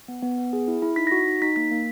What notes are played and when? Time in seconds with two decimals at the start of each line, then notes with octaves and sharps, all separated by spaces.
0.08 B3
0.22 B3
0.38 B3
0.53 G#4
0.68 E4
0.82 E4
0.96 D#4 B6
1.07 A#6
1.11 F#4 B6
1.26 D#4
1.42 D#4 B6
1.56 A#3 B6
1.71 A#3